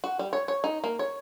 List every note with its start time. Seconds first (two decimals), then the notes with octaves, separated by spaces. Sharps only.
0.04 F#4
0.19 G3
0.33 C#5
0.48 C#5
0.64 D#4
0.84 A#3
0.99 C#5